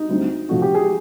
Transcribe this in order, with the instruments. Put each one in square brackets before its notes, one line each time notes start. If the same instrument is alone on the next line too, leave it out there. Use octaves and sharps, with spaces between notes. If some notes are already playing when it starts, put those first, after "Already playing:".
Already playing: [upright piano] D#4
[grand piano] D2 D3 G3 C4
[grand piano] C3 F3 A3 C4 [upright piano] F#4
[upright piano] G4
G#4